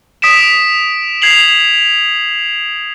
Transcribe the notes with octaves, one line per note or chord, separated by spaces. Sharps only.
D#6 B6 D7 E7
G#6 C7 F7 F#7